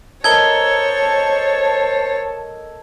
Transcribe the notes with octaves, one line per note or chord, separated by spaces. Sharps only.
A4 A#4 C5 C#5 D#5 A5 G#6 G7